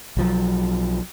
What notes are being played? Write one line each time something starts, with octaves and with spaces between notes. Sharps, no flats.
B1 F3 F#3